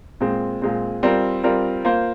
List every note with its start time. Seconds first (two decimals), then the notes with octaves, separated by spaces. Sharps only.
0.21 A#2 G#3 C4
0.62 A#2 G#3 C4
1.03 G3 C4 F4 A#4
1.44 G3 C4 F4 A#4
1.85 A#3 F4 C5